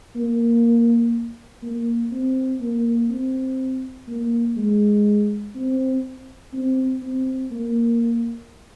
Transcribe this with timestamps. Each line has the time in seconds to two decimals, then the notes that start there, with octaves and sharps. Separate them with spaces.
0.15 A#3
1.62 A#3
2.11 C4
2.60 A#3
3.10 C4
4.08 A#3
4.57 G#3
5.55 C4
6.53 C4
7.02 C4
7.51 A#3